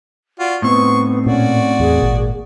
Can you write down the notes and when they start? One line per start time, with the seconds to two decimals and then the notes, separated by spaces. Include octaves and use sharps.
0.40 F4 F#4 D5
0.62 A2 B3 C4 D#4 C#6
1.26 A#2 C#4 F#4 D5
1.80 E2 G#4
2.01 G#1 A#2